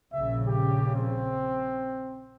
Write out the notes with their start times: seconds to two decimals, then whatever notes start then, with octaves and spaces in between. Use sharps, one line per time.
0.13 A#1 C#3 E5
0.45 G4
0.95 C4